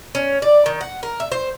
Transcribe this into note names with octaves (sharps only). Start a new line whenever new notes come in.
C#4
D5
D#3
F#5
A#4
E5
C5